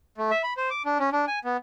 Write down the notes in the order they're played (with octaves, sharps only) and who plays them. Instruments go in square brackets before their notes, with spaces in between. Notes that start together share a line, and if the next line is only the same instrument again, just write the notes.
[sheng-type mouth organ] A3
E5
B5
C5
D6
D4
C#4
D4
G#5
B3